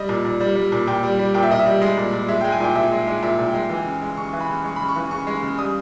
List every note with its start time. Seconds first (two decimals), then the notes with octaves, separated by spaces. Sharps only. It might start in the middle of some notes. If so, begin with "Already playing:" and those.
Already playing: G3 D#5
0.09 A#2
0.25 A#2
0.40 G3
0.56 G3
0.72 A#2
0.87 A#2 G5
1.03 G3
1.19 G3
1.34 A#2 G5
1.43 E5
1.50 A#2 D#5
1.59 E5
1.66 G3
1.81 G#3 D#5
1.97 A#2
2.13 A#2
2.28 G#3 E5
2.41 G5
2.44 G#3
2.52 G#5
2.60 A#2 G5
2.75 A#2 E5
2.92 G#3
3.07 G#3
3.23 A#2 E5
3.38 A#2
3.47 G5
3.54 G#3
3.70 E3 G5
3.86 C#3
4.02 G#3
4.17 C#3 C#6
4.33 E3
4.40 B5
4.48 C#3
4.64 G#3 C#6
4.76 C#3 B5
4.88 C#6
4.96 E3
5.11 C#3 C#6
5.27 G#3
5.43 C#3
5.58 G3 D#6